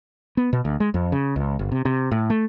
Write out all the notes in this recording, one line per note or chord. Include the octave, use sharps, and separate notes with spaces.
B3
B2
D2
G#3
F2
C#3
C#2
G1
C3
C3
A2
A3